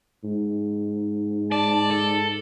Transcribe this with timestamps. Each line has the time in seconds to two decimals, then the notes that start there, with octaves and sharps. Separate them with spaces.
0.24 G#2
1.52 D5 A5
1.90 A4